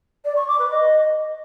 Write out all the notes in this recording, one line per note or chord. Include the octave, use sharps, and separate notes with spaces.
D5
C#6
D6
B4
D#5